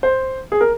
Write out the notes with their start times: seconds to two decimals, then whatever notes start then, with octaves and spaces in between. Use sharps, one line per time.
0.03 C5
0.52 G#4
0.61 A#4